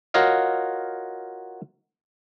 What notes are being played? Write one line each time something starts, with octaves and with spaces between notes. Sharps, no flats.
F4 F#4 A#4 C#5 D#5 F5